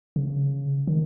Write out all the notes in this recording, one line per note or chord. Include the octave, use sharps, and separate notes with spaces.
C#3
D#3